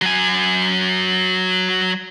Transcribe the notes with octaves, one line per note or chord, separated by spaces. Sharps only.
F#3 G#5